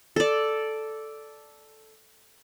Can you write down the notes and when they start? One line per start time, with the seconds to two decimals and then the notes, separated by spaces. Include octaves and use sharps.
0.16 A4 D5